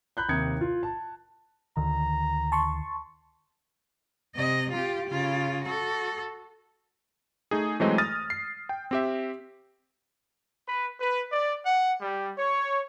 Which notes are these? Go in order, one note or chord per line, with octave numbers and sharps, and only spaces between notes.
A#5 B5 F#6 G6
D#2 C3 A#5 D#6 G#6 C#7
F4
A5
D2 D3 D#3 A#5
A5 C6 C#6
C3 D#5
F4 G4
C#3 F4
F#4 A4
A3 D#4 G#4
E3 F#3 G#3 A3 C4 D#5
D#6 F6 A6 A#6 D#7
C7
G5
C4 G4 E5
B4
B4
D5
F#5
G3
C#5